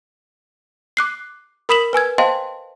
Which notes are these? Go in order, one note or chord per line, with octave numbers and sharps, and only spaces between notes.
D6 F#6 C7
A#4 B5 D#6 B6 E7 F#7
B4 G#5 E6 G#6
C5 D#5 F5 G5 A5 C6